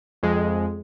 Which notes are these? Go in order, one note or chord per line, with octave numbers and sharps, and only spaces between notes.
F2 G#3